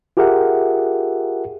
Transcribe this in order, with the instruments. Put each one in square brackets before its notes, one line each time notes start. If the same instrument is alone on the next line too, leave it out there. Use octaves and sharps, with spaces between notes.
[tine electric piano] F4 G4 G#4 A#4 E5 F#5